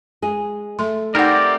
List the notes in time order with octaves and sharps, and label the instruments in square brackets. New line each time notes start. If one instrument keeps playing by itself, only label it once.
[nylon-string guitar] G#3 G#4
[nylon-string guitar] A3 [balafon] A4 C6
[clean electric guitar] C4 G4 A#4 [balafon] D#4 F#5 [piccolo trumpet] D5